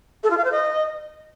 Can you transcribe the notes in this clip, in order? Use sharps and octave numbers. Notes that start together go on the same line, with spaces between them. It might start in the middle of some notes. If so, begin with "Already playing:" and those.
A4
F4
F5
C5
D#5